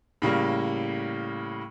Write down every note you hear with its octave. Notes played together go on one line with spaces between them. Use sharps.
A2 C#3 G3 A#3